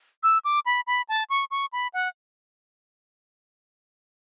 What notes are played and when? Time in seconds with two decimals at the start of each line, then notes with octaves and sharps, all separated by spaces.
0.23 E6
0.45 D6
0.66 B5
0.87 B5
1.09 A5
1.30 C#6
1.51 C#6
1.73 B5
1.94 F#5